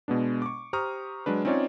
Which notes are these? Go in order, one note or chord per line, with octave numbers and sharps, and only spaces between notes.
B2 G#3 B3 D4
C#6 D6
G4 C5 A#5 C#6 D#6 F6
F#3 G#3 D4 B4
C4 C#4 D#4 F4 C#5 D5